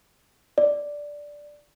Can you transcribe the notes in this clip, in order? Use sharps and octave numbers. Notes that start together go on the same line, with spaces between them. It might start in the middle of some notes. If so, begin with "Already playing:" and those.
D5